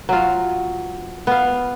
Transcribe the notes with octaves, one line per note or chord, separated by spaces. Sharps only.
F#3 F4
B3 F5